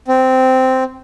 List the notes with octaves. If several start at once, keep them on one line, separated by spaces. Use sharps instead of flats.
C4